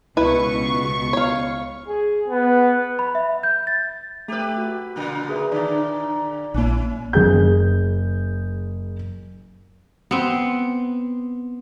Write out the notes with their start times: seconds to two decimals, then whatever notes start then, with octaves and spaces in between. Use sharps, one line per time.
0.17 C#2 B2 E4 B4 C#6
1.13 C#5 F5
1.88 G#4
2.28 B3
2.99 B5
3.15 E5
3.43 G6
3.67 A6
4.28 A3 G4 B4 E6
4.58 F#4
4.96 A#2 C#3 A#3
5.29 G#4 B4 E5
5.52 A#2 D3 D5
6.54 A#1 A#3 C#4 E4
7.13 F#1 G#4 G6
10.11 B3 C4